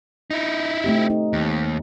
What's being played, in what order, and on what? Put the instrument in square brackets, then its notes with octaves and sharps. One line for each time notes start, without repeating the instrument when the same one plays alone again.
[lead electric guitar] D#4 E4
[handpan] A3 C4 G4
D#4
[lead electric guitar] D#2